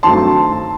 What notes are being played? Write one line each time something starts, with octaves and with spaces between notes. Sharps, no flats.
G2 D#3 F#3 A3 C4 A5 C6